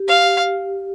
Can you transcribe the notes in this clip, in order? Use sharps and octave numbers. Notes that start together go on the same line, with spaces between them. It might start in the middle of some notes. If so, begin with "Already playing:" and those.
Already playing: G4
F5